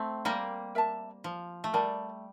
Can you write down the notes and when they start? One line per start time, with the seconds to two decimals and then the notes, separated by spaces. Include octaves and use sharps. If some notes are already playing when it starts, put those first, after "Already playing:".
Already playing: A3 C4
0.25 G3 A#3
0.75 A#4 E5 A5
1.24 F3
1.64 A3
1.73 G3 A#4 D5 A5